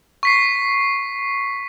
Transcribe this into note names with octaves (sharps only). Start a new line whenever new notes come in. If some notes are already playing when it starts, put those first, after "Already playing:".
C#6 B6 C7